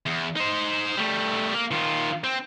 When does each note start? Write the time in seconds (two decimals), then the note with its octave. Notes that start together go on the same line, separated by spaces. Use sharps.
0.06 E2
0.36 D#4 C5
0.97 G3 A3
1.54 A#3
1.71 D#3 F4
2.24 C4